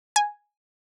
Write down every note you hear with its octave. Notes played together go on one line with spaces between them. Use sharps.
G#5